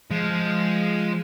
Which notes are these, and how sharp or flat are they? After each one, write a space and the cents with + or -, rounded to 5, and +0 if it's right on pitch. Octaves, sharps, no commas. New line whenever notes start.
F3 -5 G#3 +0